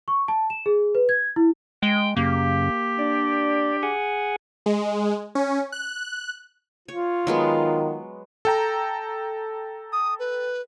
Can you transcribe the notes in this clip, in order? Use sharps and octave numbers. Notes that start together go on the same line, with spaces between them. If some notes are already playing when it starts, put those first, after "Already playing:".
C#6
A5
E7
G#4
B4
G#6
E4
G#3 G5
F#2 C#3 A#3 G4
D4 D5
G#4 F#5 G#5
G#3
C#4
F#6
F4 C#5
D#3 F#3 G#3 B3
A4 G5 A#5
D#6
B4